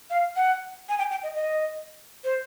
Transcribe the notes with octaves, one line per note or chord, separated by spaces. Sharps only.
F5
F#5
G#5
G5
G5
D#5
D#5
C5